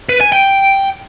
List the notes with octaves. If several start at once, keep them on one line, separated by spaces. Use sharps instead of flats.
B4
G#5
G5